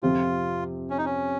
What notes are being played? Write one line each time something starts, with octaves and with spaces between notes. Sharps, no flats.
F2 C3 F3 C4 F4 G4
C#4
D#4
C#4